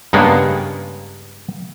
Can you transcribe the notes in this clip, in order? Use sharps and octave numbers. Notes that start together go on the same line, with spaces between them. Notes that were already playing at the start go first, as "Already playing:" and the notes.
G2 C#3 G#3 A#3 B3